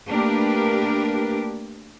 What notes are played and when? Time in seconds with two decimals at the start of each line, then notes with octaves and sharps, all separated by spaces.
0.10 A3 A#3 D4 G4 A#4 B4